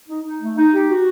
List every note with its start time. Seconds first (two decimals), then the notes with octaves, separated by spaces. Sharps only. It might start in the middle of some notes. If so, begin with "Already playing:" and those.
0.09 D#4
0.24 D#4
0.41 A3
0.57 D#4
0.73 G4
0.88 F#4